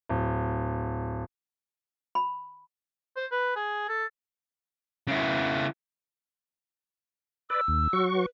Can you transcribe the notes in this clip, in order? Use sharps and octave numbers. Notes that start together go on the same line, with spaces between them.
D1
B5
C5
B4
G#4
A4
C#3 E4
B4 D5 E6
D#2
F#3 F#4 C#6
B4